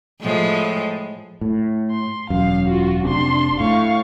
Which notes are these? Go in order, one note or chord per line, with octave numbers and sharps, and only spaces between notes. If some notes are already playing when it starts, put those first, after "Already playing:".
A2 F3 G#3
A2
C6
E1 F#2 F5
F4 F#4
F1 C3 D4 C6
A2 F5 C#6